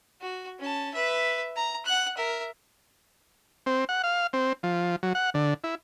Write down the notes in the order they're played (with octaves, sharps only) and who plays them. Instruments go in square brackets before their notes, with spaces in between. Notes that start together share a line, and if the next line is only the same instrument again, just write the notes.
[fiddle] F#4
C#4 A5
B4 E5
A#5
F#5 F#6
A#4 E5
[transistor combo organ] C4
F#5
F5
C4
F3
F#3
F#5
D3
E4